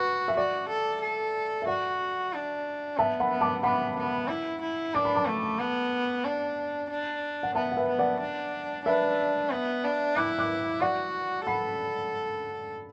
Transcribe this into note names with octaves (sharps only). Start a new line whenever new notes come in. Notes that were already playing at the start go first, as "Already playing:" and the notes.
Already playing: F#4 B4
E5
F#4 D5
A4
A4
E5
F#4 D5 F#5
D4
B3 E5 A5
F#5 B5
B3
A5 D6
B3 F#5 B5
B3
E4
E4
D4 D6
B5
A5 D6
A3
B3
D4
D4
F#5
B3 E5 A5
F#5
B4 E5
B3
D5 F#5
D4
D4 B4 E5
B3
D4
E4 D6 F#6
D6 F#6
F#4 D5 F#5
A4 F#5 B5